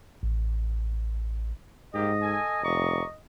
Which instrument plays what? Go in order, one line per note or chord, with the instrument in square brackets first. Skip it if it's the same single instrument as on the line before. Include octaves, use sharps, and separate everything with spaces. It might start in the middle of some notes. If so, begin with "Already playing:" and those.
[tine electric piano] A1
[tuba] G#2 [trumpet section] A#3 G4 [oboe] D#5
[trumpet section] A4 G#5
[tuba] F1 [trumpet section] D5 A#5 C#6